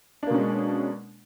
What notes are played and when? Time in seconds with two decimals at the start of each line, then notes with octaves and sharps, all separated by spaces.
0.23 D4
0.26 A#3
0.30 B2
0.34 C#4
0.38 G#3